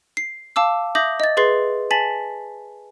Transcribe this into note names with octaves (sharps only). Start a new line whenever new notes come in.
C7
F5 A5 D6 E6
E5 D6 D#6 G6 A#6 F#7
D#5 A6
G#4 B4 C6 A6 C7
G#5 A5 A6 B6 F#7